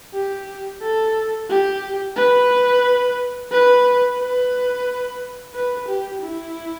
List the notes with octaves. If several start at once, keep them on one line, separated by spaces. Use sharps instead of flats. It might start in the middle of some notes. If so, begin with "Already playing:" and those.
G4
A4
G4
B4
B4
B4
B4
G4
E4